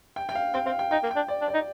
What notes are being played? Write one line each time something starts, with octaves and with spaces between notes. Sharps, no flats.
G5
G5
F5
C4 G5
C4 F5
G5
D#4 G5
A#3
G5
D4
D5
D4
D5
D#4